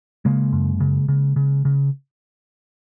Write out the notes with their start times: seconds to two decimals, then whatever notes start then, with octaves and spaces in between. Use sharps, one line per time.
0.25 C#3 G#3 A#3
0.53 F#2
0.80 C#3
1.08 C#3
1.36 C#3
1.65 C#3